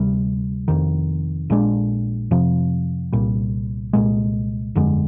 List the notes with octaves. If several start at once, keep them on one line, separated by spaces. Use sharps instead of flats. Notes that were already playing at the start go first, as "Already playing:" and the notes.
Already playing: D2 C3 G3
F1 F2 D#3
A#1 A#2 G#3 D4
F2 C3 F3
C2 A#2 G3
C2 A#2 G#3
G1 F2 D3 G#3